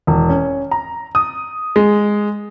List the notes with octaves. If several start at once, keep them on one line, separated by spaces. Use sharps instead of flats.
E1
C#4
A#5
D#6
G#3